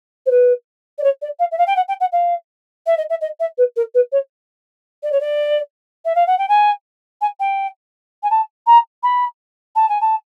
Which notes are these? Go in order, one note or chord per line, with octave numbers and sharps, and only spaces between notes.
C5
B4
D5
C#5
D5
F5
E5
F5
G5
F#5
G5
F#5
F5
E5
D#5
E5
D#5
E5
B4
A#4
B4
C#5
D5
C#5
D5
E5
F5
F#5
G5
G#5
G#5
G5
G#5
A5
A#5
B5
A5
G#5
A5